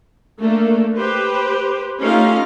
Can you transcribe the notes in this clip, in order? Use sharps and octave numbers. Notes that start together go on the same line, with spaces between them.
A3 A#3 D4 A4
G4 B4 C5
A3 C#4 D#4 F4 G4 F5